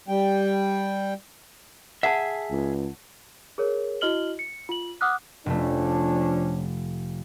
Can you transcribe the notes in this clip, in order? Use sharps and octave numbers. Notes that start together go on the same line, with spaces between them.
G3 G5
G#4 E5 F#5 A5
C#2
G#4 A#4 C#5
E4 F#4 D#5 F6 F#7 G7
C#7
F4 F#7
F#5 D6 D#6 F6 F#6
F1 F3 A3 C#4 D4